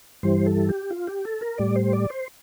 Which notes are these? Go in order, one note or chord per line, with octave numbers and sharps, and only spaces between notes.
G2 E3 G3 C5
A4
G4
F4
G4
A4
A#4
A2 G3 D5
C5
D5
C5